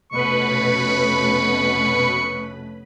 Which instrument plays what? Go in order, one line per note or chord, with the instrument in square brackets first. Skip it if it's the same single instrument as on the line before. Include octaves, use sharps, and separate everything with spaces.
[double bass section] F1 A3 C#4 [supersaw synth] B2 B4 B5 [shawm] C#6